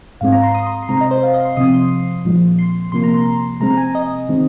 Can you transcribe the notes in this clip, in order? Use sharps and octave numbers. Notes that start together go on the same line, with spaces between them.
G#2 G#3 C4 F5
A#5
C6
D#6
C6
C6
C3 G#3 C4 A#5
D#5
C5
F5
D#5
C6
C3 F3 C4 D#6
C6
A#2 F3 G#3
C6
C3 F3 A#3 C6
A#5
C6
C3 G#3 C4 A#5
G#5
D#5
D#3 G#3 C4